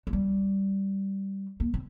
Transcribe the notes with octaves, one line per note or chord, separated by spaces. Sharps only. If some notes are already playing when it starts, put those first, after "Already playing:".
A3
G3
A#3
C4